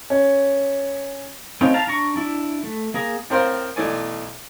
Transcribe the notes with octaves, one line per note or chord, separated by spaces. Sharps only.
C#4
A3 C4 C#4 D#4 F4
F5 A5 A#5
D4 A#5 C#6
D4 E4
A3
A#3 G#4 A#5
A2 C4 A#4 C5 F5
B1 E3 A3 D5 G#5